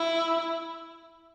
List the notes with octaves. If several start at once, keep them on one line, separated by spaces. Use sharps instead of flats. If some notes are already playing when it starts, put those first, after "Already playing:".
Already playing: E4